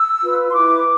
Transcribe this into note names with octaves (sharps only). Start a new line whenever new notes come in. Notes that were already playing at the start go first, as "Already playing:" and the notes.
Already playing: E6
F4 B4
C6
E4 B4 D6